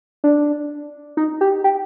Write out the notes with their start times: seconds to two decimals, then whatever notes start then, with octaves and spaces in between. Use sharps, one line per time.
0.24 D4
1.17 D#4
1.41 G4
1.64 G4